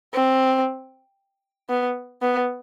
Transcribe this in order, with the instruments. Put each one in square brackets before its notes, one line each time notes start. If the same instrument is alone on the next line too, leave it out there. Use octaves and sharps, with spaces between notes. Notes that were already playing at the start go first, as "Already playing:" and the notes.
[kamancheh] C4
B3
B3